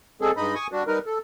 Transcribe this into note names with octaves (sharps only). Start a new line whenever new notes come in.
G3 G#3 C4 G#4 A4
G2 G#3 D#4 D#5 B5
G#5 C#6 D#6
G3 D4 F#4
G3 D#4 A#4 B4
A4